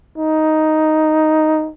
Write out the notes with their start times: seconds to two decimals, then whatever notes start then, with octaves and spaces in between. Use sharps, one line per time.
0.18 D#4